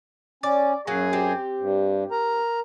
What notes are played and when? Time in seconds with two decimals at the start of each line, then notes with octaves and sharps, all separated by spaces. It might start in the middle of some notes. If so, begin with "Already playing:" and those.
0.43 C#4 D5
0.87 F#2 F#3 A#3 G#4 G#5
1.13 C4 G4
1.59 G2
2.11 A#4 A#5